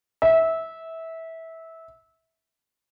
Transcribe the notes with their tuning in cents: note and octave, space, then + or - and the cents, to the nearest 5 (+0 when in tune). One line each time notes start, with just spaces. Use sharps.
E5 -20